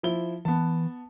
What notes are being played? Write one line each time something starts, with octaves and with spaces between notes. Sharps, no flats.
F3 E4 G7
E3 B3 A5